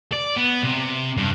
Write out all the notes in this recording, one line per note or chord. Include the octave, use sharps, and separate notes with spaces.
D5
B3
C3
G2